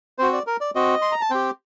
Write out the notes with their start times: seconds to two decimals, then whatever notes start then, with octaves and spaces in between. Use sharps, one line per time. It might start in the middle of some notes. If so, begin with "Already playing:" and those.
0.18 C4 F#4 C5
0.33 D5
0.47 A#4
0.61 D5
0.75 C4 F#4 D#5
1.02 C6
1.12 A#5
1.21 A5
1.31 C4 G4 G5